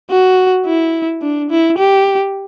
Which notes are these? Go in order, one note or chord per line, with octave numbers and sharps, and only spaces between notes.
F#4
E4
D4
E4
G4